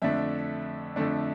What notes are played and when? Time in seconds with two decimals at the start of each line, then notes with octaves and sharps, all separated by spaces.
0.02 F2 D3 A3 D4 E5
0.96 F2 D3 A3 D4